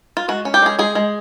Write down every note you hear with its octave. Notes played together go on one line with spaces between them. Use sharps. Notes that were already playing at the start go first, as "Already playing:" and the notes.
F4
G#3 F#4
C#4
G4
G#3 G#4
G#3 G#4
G#3